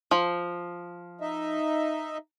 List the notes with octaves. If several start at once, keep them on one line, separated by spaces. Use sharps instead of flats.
F3
D#4 D#5 E5